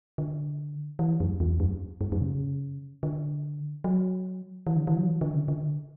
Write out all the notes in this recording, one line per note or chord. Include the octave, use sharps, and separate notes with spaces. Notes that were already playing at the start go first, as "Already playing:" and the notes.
D3
E3
F#2
E2
F#2
G2
F#2
C#3
D3
F#3
E3
D3
E3
F#3
E3
D3
C#3
D3